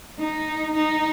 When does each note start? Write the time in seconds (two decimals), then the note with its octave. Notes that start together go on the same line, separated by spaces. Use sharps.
0.18 D#4
0.75 D#4